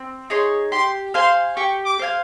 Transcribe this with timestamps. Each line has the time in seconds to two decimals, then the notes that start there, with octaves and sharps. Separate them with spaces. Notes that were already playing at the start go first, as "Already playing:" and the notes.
Already playing: C4
0.30 D#4 G#4 C#5 C6
0.72 G4 C6
1.14 C5 F5 G#5 C6
1.56 G4 C#6
1.85 D6
1.99 C5 F5 G#5